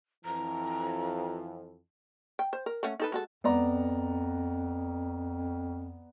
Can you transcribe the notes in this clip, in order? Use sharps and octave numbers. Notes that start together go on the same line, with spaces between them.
F2 E3 A#5
G5
C5
A#4
A3 C#4 F#5
D#4 A4 B4
G#3 F#4 A4
F2 B3 D5 A#5